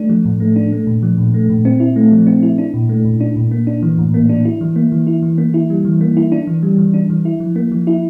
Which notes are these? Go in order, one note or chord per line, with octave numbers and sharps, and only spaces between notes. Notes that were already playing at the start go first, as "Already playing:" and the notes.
Already playing: A3 D4
F3
A2
A3
D4
A3
A#2
F3
A#2
A3
A#2
C4
E4
A3
F3
C4
E4
D4
A#2
A3
A#2
D4
A#2
A#3
D4
E3
A2
A#3
D4
E4
E3
A#3
E3
E4
E3
A#3
E4
G3
E3
A#3
E4
D4
E3
G3
E3
D4
E3
E4
F3
A#3
F3
E4